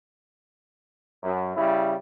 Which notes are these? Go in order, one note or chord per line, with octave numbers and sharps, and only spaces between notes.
F#2
C#3 G3 E4